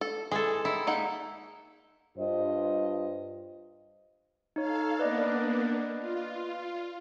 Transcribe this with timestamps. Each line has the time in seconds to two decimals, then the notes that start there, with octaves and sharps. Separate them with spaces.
0.01 A4
0.31 E3 G#3 A4
0.65 D#3 E4
0.87 A#3 D#4 F#5
2.18 G2 F4 C5 D#5
4.56 D#4 A4 C#5 F5
4.99 A#3 B3 D4 B4 D5 D#5
5.99 F4